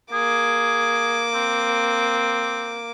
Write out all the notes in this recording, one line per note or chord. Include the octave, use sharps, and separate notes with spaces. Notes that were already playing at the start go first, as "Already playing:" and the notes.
A#3 G#4 D6
C4